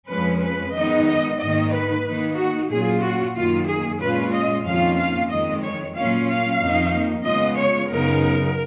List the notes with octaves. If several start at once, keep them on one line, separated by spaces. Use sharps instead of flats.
F2 F3 G#3 C#4 B4
B4
D#3 G#3 B3 D#4 D#5
D#5
G#2 D#3 A#3 D#4 D#5
B4
D#3 A#3 D#4
F#4
A#2 F#3 C#4 F4 G#4
F#4
F#2 D#3 A#3 F4
G#4
A#2 G#3 C#4 F4 B4
D#5
F2 D#3 A#3 C#4 F4 F5
F5
F2 D#3 G#3 D#5
C#5
A#2 F#3 A#3 C#4 F4 F5
F5
F2 D#3 A#3 D#4
C#3 G#3 B3 F4 D#5
C#5
F#2 C#3 F#3 B3 D#4 A#4